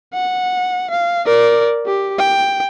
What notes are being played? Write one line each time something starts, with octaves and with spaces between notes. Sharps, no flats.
F#5
F5
A#4 D5
G4
G5